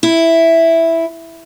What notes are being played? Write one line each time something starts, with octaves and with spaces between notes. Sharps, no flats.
E4